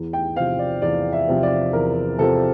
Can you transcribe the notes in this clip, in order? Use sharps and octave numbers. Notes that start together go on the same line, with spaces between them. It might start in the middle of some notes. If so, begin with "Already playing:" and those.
Already playing: E2
G5
C3 F3 C4 F5
D5
E2 D5
E5
C3 F3 C4
D5
E2 A#4
C3 F3 C4 A4